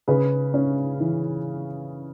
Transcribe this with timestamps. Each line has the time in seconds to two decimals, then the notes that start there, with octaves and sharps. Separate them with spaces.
0.08 C#3 G#4 B4
0.54 C#4
1.00 E3